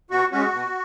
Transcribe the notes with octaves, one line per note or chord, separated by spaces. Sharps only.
B2 F#4
G#3 C#4 F#4
B2